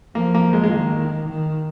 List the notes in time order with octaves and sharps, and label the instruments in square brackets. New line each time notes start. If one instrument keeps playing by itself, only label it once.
[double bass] F3 [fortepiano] A#3
[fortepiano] A#3
G#3
G#3
[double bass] D#3 [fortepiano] A#3
[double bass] D#3